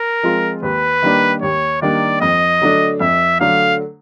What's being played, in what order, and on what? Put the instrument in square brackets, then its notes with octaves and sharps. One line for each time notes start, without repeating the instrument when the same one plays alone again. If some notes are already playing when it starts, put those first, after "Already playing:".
Already playing: [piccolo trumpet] A#4
[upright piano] F3 G#3 C4 F4
[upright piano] D#2 [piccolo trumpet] B4
[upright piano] D#3 G3 A#3 D4
[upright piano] D#2 [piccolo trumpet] C#5
[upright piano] D#3 G3 A#3 D4 [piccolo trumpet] D5
[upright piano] F2 [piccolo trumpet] D#5
[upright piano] D3 F#3 A3 D4
[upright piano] F2 [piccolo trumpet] E5
[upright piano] D3 F#3 A3 D4 [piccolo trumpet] F5